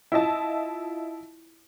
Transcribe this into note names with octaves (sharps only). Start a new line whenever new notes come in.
E4 F4 D#5 A5